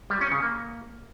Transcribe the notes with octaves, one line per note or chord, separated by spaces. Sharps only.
G3
C#4
C#3
A#3